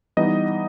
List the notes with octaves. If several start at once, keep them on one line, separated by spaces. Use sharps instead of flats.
E3 G3 B3 D#4 D#5